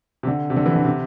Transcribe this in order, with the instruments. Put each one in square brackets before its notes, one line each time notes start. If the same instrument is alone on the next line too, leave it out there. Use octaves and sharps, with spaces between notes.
[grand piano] C3
D3
C3
D3
E3
D3
C3